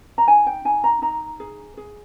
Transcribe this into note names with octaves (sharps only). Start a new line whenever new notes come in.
A#5
D#4 G#5
G5
D#4 G#5
A#5
D#4 A#5
G#4
G#4